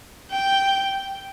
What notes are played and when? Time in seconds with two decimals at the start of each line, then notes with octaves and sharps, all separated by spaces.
0.31 G5